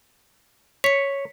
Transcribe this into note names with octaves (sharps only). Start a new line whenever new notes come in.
C#5 B6 C#7